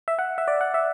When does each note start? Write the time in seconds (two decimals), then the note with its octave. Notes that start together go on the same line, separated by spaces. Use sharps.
0.08 E5
0.19 F#5
0.38 E5
0.48 D5
0.61 F#5
0.74 E5